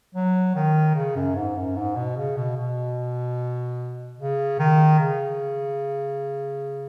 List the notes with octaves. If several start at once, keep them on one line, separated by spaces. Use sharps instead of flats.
F#3
D#3
C#3
F#2
G#2
F#2
G#2
B2
C#3
B2
B2
C#3
D#3
C#3